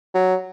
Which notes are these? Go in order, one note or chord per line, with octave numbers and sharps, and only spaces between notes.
F#3